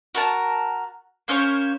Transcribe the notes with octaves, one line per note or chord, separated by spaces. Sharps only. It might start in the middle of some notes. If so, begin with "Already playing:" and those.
F#4 A#4 A5
A#3 C#4 C5 C#5